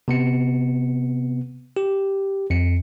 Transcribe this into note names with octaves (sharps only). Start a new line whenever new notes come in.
C3 B3 C#7
G4
F2 C#7